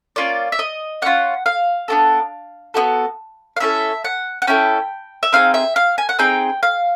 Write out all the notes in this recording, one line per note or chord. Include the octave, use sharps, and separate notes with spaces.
A#3 C#4 F4 D5
E5
D#5
A#3 C#4 F4 F#5
F5
B3 D4 F#4 A4
B3 D4 F#4 A4
F5
C#4 E4 A4 E5
F#5
F#5
C#4 E4 A4 G5
E5
C4 D#4 G#4 F5
E5
F5
G#5
F#5
C4 D#4 G#4 G5
F5